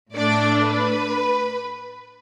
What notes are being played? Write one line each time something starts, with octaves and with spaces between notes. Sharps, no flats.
A2 A3 D4 D5
B4